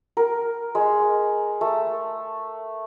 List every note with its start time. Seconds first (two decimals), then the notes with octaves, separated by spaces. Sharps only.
0.17 A#4
0.75 G#3
1.61 A3